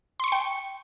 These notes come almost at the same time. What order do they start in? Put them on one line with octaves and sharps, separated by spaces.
C6 C#6 C#7 G5